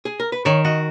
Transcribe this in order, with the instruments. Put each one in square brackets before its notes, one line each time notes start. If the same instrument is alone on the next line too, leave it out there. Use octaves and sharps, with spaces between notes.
[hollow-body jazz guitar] G#4
A#4
B4
[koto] D#3 [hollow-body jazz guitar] C#5
[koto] F#4 [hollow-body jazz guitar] D#5